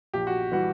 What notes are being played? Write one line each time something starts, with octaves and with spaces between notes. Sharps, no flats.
A#1 G4
F#4
E3 G3 F#4